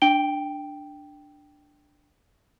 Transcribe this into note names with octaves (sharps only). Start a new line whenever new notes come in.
D4 G5 D7 G7